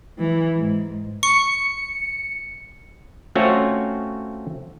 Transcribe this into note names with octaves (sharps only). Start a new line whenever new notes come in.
E3
G#2
C#6 C#7
A3 C4 C#4 F4 F#4 C#5